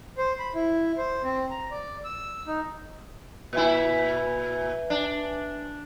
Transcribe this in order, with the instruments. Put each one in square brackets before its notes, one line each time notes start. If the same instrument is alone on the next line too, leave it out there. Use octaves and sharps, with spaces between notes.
[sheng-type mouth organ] C5
B5
E4
C5
C4
A#5
D5
E6
D#4
[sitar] A#2 E4 [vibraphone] B4 E5 G#5
[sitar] D4